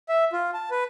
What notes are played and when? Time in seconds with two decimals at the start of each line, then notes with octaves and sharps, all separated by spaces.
0.09 E5
0.33 F4
0.54 A5
0.71 B4